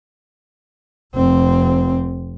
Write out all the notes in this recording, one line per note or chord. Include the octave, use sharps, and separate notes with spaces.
F1 C4